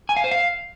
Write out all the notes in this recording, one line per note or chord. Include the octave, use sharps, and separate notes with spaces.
G#5
F5
C5
F5